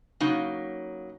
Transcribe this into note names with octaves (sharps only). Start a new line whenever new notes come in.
C#3 F#3 A#3 D#4